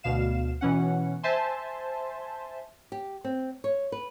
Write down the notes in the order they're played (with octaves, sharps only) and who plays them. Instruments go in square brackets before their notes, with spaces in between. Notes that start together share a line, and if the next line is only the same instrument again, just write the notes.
[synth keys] D2 B2 F5 E7
B2 E3 C#4 F#5
C5 E5 G#5 A5 C6
[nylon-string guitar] G4
C4
C#5
B4